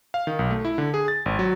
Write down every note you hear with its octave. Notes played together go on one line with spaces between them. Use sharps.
F5
D#3
B1
A3
E4
D3
G#4
A6
G#1
F#3